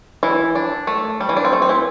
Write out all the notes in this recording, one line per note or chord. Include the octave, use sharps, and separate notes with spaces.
E3 E4
D4
A3
G3
E3
D4
C4
A3
C4
E3 E4